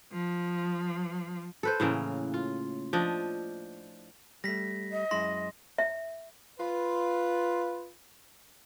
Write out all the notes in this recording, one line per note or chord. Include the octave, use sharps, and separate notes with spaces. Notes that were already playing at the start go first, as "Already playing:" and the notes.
F3
A4 B4 C5
A2 C#3 E3 A#3
F4
F3 D4 D#5
G3 A3 A#6 B6
D#5
F#2 G#3 E4 C6 A#6
E5
F4 B4